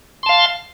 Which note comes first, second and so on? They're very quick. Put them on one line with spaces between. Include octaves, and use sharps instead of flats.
C6 A5 F5